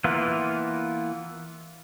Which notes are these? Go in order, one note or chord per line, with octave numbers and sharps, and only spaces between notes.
E3 A#3 B3 F4